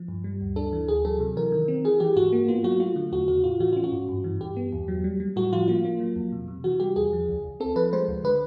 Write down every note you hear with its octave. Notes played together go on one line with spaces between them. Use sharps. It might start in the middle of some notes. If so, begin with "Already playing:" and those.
Already playing: F3
G2
G3
D2
D4 A4
E3
D2 G#4
F#3 A4
C3
E3 A#4
D#3
C4
E3 G#4
E3 G4
G#2 F#4
A#3
B3 F4
F#3 F#4
A3 F4
D3
E2 F#4
C#3 F#4
A2 F4
E3 F#4
C#4 F4
F#4
G#2
G2
E3
G2 G4
B3
E2
F#3
G3
G3
A2 F#4
F3 F4
A#3 F4
A#3
F#3
F2
C3
C3
E3 F#4
G3 G4
E2 G#4
F3
C#2
C#2
C4 A4
F3 B4
G#3 C5
C#2
D3 B4